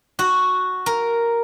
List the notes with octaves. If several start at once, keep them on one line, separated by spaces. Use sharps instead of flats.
F#4
A#4